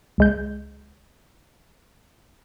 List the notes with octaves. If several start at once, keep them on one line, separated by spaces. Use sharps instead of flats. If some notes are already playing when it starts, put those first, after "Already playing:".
C#2 G#3 G6